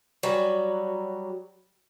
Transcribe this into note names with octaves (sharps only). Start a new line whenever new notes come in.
F#3 G3